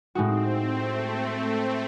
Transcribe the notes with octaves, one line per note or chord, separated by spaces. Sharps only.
A2 G#3 C4 D#4 F#4
A3